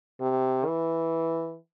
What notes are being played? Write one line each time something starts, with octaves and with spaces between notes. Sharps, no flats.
C3
E3